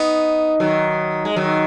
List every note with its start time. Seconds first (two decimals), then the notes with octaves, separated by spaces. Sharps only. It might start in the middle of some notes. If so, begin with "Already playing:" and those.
Already playing: B3 D#4
0.60 D#3 F#3
1.25 G#3
1.36 D#3 F#3